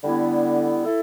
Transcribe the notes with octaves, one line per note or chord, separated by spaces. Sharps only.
D3 G3 B3 E4
E4 A4